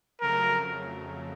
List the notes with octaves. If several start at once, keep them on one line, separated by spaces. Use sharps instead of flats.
F2 C#3 F#3 A3 A#4